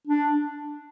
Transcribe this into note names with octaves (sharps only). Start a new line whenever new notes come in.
D4